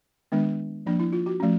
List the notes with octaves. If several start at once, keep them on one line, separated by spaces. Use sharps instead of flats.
D#3 G#3 B3 D4
F3 A#3 D4
E4
F4
F#4
F3 A3 C#4